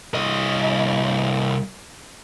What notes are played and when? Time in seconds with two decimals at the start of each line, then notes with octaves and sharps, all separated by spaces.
0.14 C2 D#5